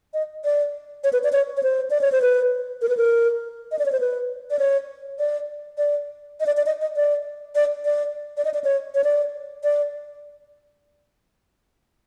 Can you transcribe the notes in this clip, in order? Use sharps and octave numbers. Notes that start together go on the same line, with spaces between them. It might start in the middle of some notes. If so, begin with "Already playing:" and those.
D#5
D5
C#5
B4
D5
C#5
C#5
C5
D5
C#5
C5
B4
A#4
B4
A#4
D#5
D5
C#5
C5
B4
D5
C#5
D5
D5
D#5
D5
D5
D#5
D#5
D5
D5
D5
D5
D#5
D5
C#5
C#5
D5
D5